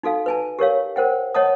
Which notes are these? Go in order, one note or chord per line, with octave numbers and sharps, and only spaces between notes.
D#4 F#4 A4 F5
B4 G#5 A5
G4 A#4 C#5 F5
A#4 C5 F#5 G5
C#5 D#5 F#5 A5 D#6